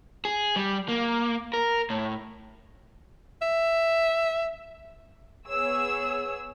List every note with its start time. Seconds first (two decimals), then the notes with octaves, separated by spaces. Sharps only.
0.25 G#4
0.56 G3
0.89 A#3
1.54 A#4
1.90 A2
3.42 E5
5.46 B3 G#4 C#5 E6